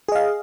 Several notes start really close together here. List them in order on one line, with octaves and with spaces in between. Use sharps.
G#4 D#5 F5